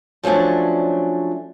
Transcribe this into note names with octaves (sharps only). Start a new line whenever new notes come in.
F3 F#3 A3 C#4 D4